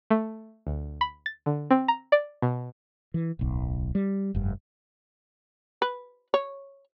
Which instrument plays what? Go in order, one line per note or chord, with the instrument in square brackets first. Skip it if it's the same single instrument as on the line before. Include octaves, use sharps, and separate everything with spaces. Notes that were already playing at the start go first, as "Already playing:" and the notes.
[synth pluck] A3
D2
B5
A6
D3
C4
A#5
D5
B2
[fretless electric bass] E3
D1 B1
G3
F1 G2
[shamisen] B4
C#5